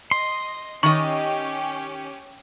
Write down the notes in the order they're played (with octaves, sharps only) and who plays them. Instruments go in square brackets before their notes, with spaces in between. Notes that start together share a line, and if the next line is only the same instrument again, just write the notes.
[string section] D#5 [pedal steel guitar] C6
[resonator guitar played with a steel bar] D#3 D#5 [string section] C#4 G4 [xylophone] C#6